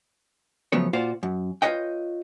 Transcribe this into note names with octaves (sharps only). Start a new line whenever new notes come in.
C#3 F3 F#3 A3 B3 C#5
A#2 F4 F#4 C5 D5
F#2
F4 F#4 B4 C#5 D#5 G5